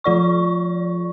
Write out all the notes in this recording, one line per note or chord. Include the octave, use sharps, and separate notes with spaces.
F3 F4 D5 C#6